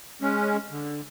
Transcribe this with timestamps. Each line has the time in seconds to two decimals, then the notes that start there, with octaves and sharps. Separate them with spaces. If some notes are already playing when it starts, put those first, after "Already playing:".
0.21 G#3 C#4
0.71 D3